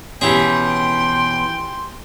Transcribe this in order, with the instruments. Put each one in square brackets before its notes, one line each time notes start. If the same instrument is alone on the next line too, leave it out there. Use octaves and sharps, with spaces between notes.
[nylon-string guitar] B2 E3 C#4 [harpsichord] G4 G#4 [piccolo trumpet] G5 [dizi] C6